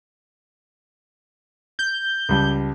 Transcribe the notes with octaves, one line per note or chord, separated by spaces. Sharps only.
G6
C#2 G3 A5